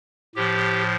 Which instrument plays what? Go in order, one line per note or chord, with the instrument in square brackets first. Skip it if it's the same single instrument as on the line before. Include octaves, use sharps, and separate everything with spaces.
[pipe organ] A2 F3 G4